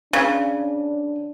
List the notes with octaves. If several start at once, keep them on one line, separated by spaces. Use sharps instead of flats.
C#3 D4